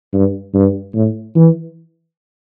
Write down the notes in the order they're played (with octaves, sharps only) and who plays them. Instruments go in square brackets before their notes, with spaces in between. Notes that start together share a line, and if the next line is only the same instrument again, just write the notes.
[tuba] G2
G2
A2
E3